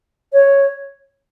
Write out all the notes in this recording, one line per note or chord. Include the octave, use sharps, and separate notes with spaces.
C#5